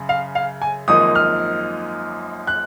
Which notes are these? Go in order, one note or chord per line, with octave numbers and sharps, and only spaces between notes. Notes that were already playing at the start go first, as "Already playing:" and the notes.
Already playing: F#2 C#3
F5
F5
G#5
G#1 F#2 F3 A#3 D#4 D#6
F6
F#6